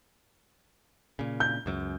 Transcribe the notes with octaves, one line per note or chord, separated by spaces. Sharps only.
A#2 C#3
G6
C#2 F#2